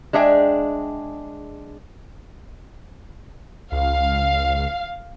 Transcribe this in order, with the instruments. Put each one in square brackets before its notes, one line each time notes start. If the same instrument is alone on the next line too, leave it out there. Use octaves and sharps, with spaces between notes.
[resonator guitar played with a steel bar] G#3 D4 G#4 E5 G5
[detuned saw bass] C#2 [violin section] F5